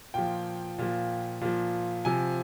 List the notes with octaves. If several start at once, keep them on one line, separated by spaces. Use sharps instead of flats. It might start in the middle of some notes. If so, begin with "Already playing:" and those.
A#2 F3 G5
A#2 F3
A#2 F3
C3 F3 G#5